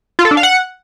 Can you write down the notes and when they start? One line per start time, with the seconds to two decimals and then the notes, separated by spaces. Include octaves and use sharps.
0.19 F4
0.25 A4
0.31 D4
0.37 F5
0.43 F#5